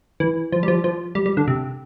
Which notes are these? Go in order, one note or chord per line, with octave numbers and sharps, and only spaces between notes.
E3
F3
G3
F3
F3
G3
G3
D3
C3